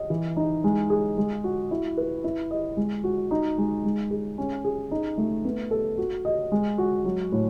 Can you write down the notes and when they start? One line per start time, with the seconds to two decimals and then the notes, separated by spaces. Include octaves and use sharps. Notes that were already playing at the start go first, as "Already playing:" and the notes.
Already playing: D#5
0.10 E3
0.37 D#4
0.64 G#3
0.90 G#4
1.17 G#3
1.44 F#4
1.71 E4
1.97 B4
2.24 E4
2.51 D#5
2.77 G#3
3.04 F#4
3.31 D#4
3.58 G#3
3.84 G#3
4.11 G#4
4.38 C#4
4.64 G#4
4.91 D#4
5.18 A3
5.45 B3
5.71 A4
5.98 F#4
6.25 D#5
6.52 G#3
6.78 F#4
7.05 F#3
7.32 A2